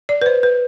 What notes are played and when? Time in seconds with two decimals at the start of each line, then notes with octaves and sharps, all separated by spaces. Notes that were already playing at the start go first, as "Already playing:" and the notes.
0.09 D5
0.22 B4
0.26 C5
0.43 B4